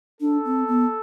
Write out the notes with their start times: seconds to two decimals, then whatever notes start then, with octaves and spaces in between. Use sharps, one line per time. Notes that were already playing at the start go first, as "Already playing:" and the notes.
0.20 D4 A4
0.45 C4
0.68 B3